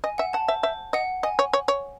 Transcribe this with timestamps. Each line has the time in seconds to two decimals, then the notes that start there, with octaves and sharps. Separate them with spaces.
0.04 D#5 G#5
0.18 E5 F#5
0.33 F#5 A5
0.48 C5 E5
0.63 C5 E5
0.93 D#5 F#5
1.23 D#5 G#5
1.39 C#5
1.53 C#5
1.68 C#5